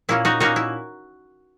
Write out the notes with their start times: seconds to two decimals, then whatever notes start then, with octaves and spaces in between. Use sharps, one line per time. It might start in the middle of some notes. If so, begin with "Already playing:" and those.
0.09 A#2 A#3 C#4 E4
0.25 D#4 F#4
0.40 A#2 A#3 C#4 D#4 F#4
0.56 E4